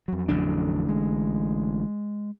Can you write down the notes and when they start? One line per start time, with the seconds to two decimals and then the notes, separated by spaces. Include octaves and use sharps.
0.08 F2 F#3
0.29 A1 D3 D4
0.89 G#3